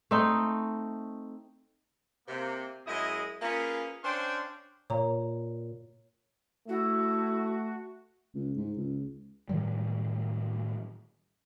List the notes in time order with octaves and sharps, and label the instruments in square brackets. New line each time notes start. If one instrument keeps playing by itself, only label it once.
[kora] A3 C4 D#4
[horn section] C3 A#3
F#2 G#3 E4 D#5
A#3 C#4 F4 G#4 B4
C#4 D4 C5 F5 G5 C6
[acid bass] A#2 [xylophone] C#5 A#5
[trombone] A3 [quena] E4 [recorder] F#4
[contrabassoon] C#2
G#2
C#2
[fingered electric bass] A2 D#3 F#3 G3